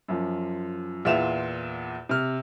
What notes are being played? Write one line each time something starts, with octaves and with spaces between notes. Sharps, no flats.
F#2 F3
E2 A#2 F4 E5 E7 F7
C3 F6